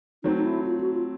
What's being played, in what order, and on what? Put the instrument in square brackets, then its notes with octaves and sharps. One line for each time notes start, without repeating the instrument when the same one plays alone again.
[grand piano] F#3 A3 C4 [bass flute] D#4
[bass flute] D#4
E4
F4
F#4
F4